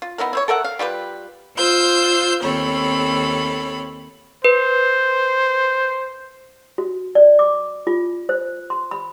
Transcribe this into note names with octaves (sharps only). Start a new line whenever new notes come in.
F4
B3 D#4 E4 A#4
E4 C5 C#5
A4 A#4 E5 F#5
F5
G3 F4 G4 B4
F4 C5 E6 G6
D#2 C4 A4 C#5 B5
B4 C5
F#4
D5
D6
F4
C5
C6
B5